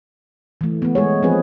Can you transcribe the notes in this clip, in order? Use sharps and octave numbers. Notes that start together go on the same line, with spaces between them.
E3 A3
A3 B3
G#3 G#4 C#5
F3 A3 C4 G#4 B4